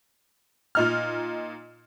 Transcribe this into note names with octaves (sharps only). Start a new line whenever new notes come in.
A#2 D#4 F6